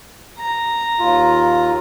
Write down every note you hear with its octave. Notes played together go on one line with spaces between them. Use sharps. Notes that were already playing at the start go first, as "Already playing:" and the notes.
A#5
D#2 F4